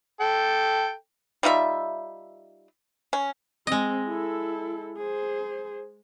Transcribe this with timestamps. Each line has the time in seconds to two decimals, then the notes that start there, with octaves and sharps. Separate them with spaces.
0.21 A4 G5
1.43 G3 D#4 F4 E5
3.13 C#4
3.67 G#3 C4 D#5
4.08 E4 A4
4.97 G#4 C5